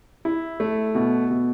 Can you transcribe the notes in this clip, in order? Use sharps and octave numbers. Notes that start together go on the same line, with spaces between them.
E4
A3
B2
B2